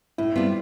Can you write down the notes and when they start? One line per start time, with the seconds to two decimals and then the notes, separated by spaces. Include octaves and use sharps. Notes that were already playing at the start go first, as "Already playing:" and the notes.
0.18 A2 E4
0.36 G3 B3 C4 F4